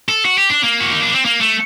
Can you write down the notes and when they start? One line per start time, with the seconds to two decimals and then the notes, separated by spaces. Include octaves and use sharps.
0.09 A4
0.25 F#4
0.38 G4
0.50 D4
0.63 A#3
0.80 F#4
0.91 D#4
1.02 D4
1.14 C4
1.25 A#3
1.41 A3